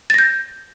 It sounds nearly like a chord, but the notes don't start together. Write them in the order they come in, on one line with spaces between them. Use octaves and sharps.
A6 A#6 G6